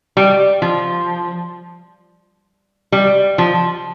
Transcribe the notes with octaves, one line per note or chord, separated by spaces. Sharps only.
G3
F3
G3
F3